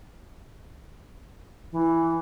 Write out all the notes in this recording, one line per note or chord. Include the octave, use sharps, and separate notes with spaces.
E3